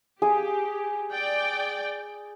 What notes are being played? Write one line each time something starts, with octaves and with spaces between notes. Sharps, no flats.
G4 G#4
D5 G5